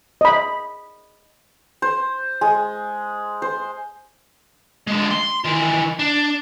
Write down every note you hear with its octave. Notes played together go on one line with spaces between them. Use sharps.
D#5 B5
C5
G#3
C5
D3 G#3
C6
D#3 E3
D4